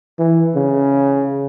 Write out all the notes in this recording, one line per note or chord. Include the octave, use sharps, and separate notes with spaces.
E3
C#3